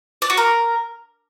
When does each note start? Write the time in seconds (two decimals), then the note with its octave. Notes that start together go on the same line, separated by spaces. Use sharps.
0.22 D5
0.30 F#4
0.37 A#4